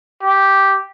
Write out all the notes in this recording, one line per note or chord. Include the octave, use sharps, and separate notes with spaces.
G4